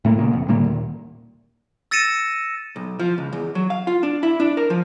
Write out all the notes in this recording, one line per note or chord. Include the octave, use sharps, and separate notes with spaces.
A2 A3 A#3
A#2 C#3 A#3
F#1 F2
A2 D3 G3 A#3
D#2 A#2
E6 A6 A#6 C#7 D#7 E7
B1
F3
C#2
E2
F#3
F5
F4
D4
E4
D4
A#4
F3